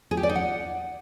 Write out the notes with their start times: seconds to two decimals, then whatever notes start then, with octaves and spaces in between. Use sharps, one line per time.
0.11 G#4
0.17 G4
0.23 D5
0.29 D#4
0.35 F#5